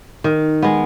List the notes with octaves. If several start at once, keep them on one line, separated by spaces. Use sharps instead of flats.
D#3
G#3 B3